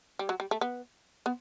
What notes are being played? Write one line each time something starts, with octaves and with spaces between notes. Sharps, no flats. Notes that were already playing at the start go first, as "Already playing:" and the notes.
G3
F#3
G3
A3
B3
B3